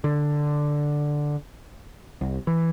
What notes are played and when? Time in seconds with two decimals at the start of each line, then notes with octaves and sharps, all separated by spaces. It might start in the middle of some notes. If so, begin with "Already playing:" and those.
0.04 D3
2.21 C2
2.47 E3